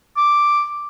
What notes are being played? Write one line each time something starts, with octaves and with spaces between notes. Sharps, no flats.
D6